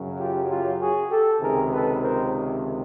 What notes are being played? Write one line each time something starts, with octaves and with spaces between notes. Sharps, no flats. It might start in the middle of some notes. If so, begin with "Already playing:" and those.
Already playing: F#2 C#3 F#3
F4 G4
F4 G4
F#4 G#4
G4 A4
C#2 C3 D#3 G#4 A#4
A4 B4
A#4 C5